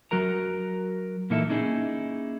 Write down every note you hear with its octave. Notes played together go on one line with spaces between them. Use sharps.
F#3 F#4 A#4 A#5
A#2 E3 A#3 D#4 A4 E5
A#3 C#4 D#4 E4 G#4